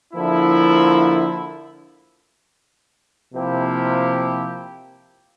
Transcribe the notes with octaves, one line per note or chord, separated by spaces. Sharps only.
D3 F3 A#3 E4
C3 F3 A#3 E4 G4